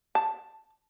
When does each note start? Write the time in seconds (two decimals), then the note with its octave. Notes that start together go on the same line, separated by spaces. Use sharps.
0.15 A5